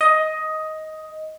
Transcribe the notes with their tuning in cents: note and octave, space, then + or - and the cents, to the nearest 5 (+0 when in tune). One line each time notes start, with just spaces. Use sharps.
D#5 +10